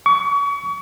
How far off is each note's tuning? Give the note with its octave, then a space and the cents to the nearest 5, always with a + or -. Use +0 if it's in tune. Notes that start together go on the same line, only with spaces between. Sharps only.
C#6 +35